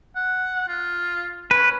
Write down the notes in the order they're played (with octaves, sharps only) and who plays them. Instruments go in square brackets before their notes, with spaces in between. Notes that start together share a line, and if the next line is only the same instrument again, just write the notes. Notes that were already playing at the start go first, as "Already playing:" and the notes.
[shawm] F#5
F4
[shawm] C#4 [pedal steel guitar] B4